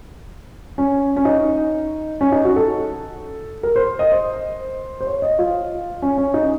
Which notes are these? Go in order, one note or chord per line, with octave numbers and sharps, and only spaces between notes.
C#4
C#4
D#4
C#4
D#4
F#4
A4
A#4
C5
D#5
C5
C5
C#5
D#5
F4
C#4
C#4
D#4